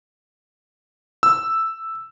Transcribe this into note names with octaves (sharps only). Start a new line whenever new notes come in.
E6